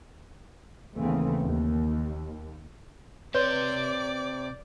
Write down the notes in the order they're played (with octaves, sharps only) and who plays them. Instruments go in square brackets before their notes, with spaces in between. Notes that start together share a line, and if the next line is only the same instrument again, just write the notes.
[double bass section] D#2 C#3 E3 A3 B3 C4
D#2
[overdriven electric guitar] C3 C6 [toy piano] B4 C#5 [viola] D5 D6 [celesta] G6